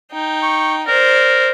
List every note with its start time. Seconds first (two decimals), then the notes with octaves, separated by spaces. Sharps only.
0.12 D#4 G5
0.43 C#6
0.87 A#4 C5 D5